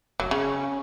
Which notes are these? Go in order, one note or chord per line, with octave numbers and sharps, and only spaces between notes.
F1 F#3
C#3 C#4